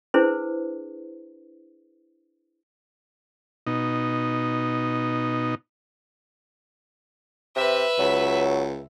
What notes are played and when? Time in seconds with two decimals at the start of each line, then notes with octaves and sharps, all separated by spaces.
0.14 D4 E4 G#4 B4 C5
3.67 B2 D#4
7.56 C3 B4 E5
7.99 C#2 F#3